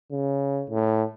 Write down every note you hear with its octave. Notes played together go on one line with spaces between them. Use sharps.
C#3
A2